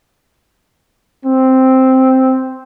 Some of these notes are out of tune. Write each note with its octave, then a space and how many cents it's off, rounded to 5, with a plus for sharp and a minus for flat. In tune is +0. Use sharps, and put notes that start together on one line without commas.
C4 +0